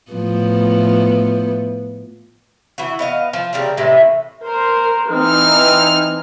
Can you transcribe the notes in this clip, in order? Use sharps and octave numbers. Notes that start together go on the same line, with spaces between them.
A2 F3 B3
E3 F#4
B3 D#5 F5
F3
C#3 G3 A#3 C4
A2 C3 D#3 E3
A#4 C5
E3 C4 D#4 F6